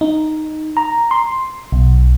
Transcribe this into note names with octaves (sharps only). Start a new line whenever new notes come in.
D#4
A#5
C6
B1